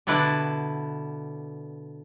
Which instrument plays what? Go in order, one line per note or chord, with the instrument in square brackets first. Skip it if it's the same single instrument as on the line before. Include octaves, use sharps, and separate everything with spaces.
[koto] B2 D3 E4 B4 D5